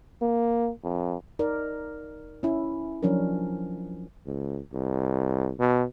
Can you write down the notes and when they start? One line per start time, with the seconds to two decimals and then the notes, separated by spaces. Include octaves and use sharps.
0.22 A#3
0.84 F2
1.39 D#4 A#4 D5
2.43 C#4 E4
3.03 F3 F#3 C#4 D4 A#4
4.26 C#2
4.73 C2
5.59 B2